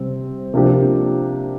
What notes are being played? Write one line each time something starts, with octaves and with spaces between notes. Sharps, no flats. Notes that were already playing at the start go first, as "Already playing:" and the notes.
Already playing: C3 G3 C4
C3 F3 A#3 D4 G4